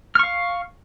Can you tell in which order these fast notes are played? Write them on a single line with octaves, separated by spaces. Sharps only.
F6 C#6 F5